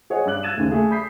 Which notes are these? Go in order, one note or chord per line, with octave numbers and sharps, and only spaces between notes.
G#4 C#5 D#5 F#5
G2 D5 D6 F#6 F#7
E6 F#6 G#6 A6 D#7 E7
D#2 C#3 A3
A3 G#4
B5 D#6 G6 B6 C7